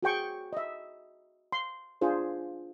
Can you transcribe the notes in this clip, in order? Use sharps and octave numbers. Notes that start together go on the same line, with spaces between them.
F#4 G#4 G5 C#6
D#5 E5
C6
D4 F4 G#4 C5